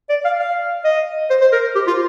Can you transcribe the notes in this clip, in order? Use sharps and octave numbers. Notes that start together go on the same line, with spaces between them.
D5
F5
F5
D#5
C5
C5
A#4
G4
F4